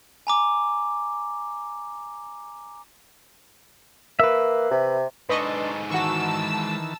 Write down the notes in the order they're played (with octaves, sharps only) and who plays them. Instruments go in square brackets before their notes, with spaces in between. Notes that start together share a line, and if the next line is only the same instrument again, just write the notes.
[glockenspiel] G#5 A#5 D6
[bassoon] A#3 [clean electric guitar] B4 E5
[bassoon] C3
[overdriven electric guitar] G#2 A4 [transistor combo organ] D4 C6 [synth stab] B4 D#5 C#6
[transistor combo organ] D#3 E3 [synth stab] F#4 C#6 [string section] A5 E6